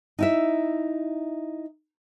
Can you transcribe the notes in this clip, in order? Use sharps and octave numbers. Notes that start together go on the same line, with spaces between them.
D#4 E4 E5